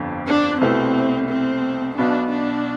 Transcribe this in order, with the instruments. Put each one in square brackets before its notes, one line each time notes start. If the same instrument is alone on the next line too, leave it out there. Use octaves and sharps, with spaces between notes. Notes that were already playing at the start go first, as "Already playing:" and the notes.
Already playing: [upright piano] G1 F2 D3
[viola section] D4
[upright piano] C2 B2 A3 E4 B4 [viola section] C4
[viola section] C4
[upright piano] B1 B2 B3 [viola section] D4
[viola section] D4